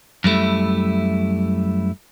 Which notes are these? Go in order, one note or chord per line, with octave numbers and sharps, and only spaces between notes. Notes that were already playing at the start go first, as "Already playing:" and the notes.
F#2 G3 A3 E4